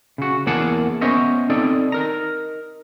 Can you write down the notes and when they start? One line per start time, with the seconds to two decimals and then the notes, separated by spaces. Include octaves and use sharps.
0.18 C#3 F#4
0.46 E2 E3 A#3 G#4 F#5 A5
1.01 B3 C#4 C5 C#5 D#5 E5
1.50 C4 D#4 A4 D5
1.92 D#4 A#4 A#5